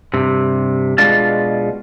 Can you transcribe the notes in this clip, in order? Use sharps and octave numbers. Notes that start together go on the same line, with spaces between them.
G2 C3
B2 G#3 D4 F4 A5